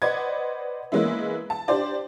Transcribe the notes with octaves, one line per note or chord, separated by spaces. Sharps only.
B4 C5 D5 D#5 F#5 G#6
E3 G#3 A#3 B3 C#4 E4
A5
D4 G4 C5 D5